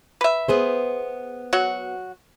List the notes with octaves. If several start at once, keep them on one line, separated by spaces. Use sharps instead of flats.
B4 E5
B3 G#4 C5
F#3 F#4